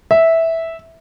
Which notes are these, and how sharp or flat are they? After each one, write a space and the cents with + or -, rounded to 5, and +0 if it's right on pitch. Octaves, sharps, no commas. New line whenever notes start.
E5 -10